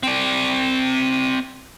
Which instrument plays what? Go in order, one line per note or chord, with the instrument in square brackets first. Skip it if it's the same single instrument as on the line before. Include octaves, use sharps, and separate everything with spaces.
[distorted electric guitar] C4 D5